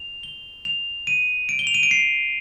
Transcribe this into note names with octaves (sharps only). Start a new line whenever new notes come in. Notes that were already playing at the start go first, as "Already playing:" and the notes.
Already playing: F7
G7
F7
D#7
D7
G7
F7
D#7
D7
C7